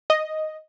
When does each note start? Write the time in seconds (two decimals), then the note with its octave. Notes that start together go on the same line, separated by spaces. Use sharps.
0.10 D#5